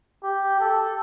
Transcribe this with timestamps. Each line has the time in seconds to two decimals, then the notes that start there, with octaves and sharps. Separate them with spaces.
0.24 G4
0.60 A4